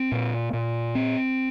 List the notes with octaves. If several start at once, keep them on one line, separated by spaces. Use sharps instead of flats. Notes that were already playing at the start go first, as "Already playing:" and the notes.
Already playing: C4
A#2
A#2
C4